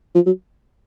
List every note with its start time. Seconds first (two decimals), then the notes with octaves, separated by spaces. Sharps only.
0.15 F3
0.26 F#3